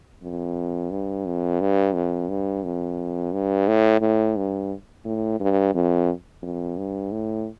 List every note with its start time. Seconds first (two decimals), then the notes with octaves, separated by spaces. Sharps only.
0.22 F2
0.91 G2
1.26 F2
1.61 G2
1.94 F2
2.29 G2
2.64 F2
3.33 G2
3.67 A2
4.01 A2
4.37 G2
5.05 A2
5.40 G2
5.74 F2
6.42 F2
6.77 G2
7.12 A2